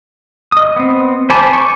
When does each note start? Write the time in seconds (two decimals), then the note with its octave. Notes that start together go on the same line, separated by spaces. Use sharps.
0.52 D#5 D#6
0.76 B3 C4
1.30 C5 G#5 A5 B5 D6
1.53 C#6 D6